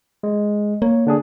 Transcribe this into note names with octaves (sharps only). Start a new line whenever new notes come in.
G#3
A#3 C#5
D3 D4 G#4